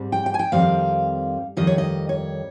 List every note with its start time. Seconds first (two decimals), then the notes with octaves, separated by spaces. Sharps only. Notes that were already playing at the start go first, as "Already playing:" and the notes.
Already playing: G#2 G3 C4
0.12 G5
0.26 G5
0.34 G#5
0.39 G5
0.52 F2 D#3 G3 C4 F5
1.57 F2 D#3 G3 D#5
1.67 C#5
1.78 D#5
2.09 C#5